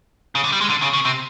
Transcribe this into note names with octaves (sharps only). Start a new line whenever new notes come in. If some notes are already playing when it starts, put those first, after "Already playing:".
C#3
D3
G3
G#3
D3
C#3
C#3
C3